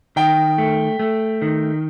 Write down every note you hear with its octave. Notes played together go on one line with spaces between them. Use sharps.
D#3 G5
A3
A3
D#3